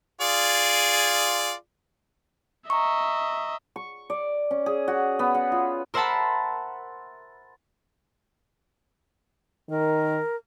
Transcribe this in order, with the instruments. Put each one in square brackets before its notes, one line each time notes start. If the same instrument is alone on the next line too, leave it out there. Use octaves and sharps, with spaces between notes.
[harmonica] F4 G#4 D5
[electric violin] D#5 E5 [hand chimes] A#5 C#6
[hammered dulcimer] C#6
D5
C#4
G#4
F#4
B3
F#5
F4
[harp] A#4 C5 E5 F#5 A5 B5
[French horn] D#3 [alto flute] A#4